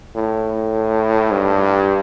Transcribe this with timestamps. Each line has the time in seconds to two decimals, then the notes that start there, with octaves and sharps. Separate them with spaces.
0.15 A2
1.32 G2